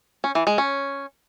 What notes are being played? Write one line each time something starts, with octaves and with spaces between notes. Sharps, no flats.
C#4
E3
G#3
C#4